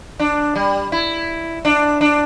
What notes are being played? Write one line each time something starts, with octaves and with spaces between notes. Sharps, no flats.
D4
G3
E4
D4
D4